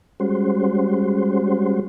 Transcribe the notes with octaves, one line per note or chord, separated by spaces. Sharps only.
G3 G#3 C#4 F#4 C5